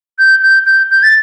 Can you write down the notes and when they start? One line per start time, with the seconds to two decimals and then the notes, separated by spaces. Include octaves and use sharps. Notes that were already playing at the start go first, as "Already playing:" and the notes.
0.19 G6
0.42 G6
0.66 G6
0.91 G6
1.03 A6